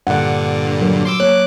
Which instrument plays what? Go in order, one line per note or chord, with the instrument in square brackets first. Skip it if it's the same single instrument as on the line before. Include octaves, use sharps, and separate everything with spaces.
[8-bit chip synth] G2 A#2 D3 [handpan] F#5
[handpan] F#3 A#4
[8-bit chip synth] C6 D6 E6
[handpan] A#3 C#5 [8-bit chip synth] D6 F#6